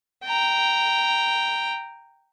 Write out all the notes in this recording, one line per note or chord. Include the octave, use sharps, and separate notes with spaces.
G5 A#5